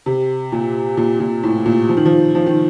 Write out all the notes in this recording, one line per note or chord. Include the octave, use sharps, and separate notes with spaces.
C3
A#2
A#2
A#2
A2
A#2
F3
D#3
F3
F3
D#3